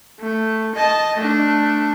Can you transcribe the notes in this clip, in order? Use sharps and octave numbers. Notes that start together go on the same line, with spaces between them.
A3
D#5 A5
A3 D4